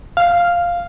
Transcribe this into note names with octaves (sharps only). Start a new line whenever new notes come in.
F5